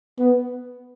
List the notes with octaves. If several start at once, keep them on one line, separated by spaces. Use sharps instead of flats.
B3